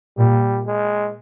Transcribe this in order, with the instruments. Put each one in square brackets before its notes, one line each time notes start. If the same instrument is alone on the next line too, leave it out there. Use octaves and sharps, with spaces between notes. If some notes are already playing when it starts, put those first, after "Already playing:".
[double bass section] A#2 [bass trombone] G3
[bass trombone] G#3